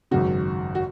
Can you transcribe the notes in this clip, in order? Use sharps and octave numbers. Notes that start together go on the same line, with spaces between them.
G#1 F#2 C#3 F#4
F#4